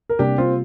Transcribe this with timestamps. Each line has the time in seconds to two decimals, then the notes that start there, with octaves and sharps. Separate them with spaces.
0.10 A#4
0.19 C3 G3 A#3 D4 G4
0.38 C4 F4